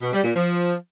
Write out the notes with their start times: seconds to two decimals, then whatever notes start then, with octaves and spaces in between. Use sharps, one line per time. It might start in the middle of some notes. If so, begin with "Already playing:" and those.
0.01 B2
0.13 G3
0.24 A#2
0.35 F3